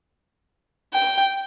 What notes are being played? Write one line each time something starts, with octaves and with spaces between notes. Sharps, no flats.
G5